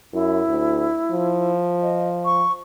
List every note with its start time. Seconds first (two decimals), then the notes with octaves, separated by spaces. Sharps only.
0.13 F#2 E4
0.48 D2
1.12 F3
1.82 D#5
2.25 C#6